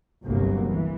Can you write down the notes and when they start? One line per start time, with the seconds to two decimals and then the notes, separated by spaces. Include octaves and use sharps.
0.23 G1 C2 F#3 A#3
0.66 E3